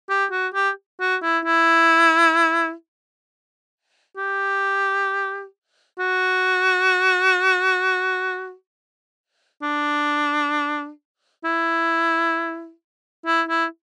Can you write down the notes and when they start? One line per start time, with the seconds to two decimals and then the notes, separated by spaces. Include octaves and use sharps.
0.10 G4
0.32 F#4
0.54 G4
1.01 F#4
1.23 E4
1.45 E4
4.18 G4
5.99 F#4
9.63 D4
11.45 E4
13.26 E4
13.49 E4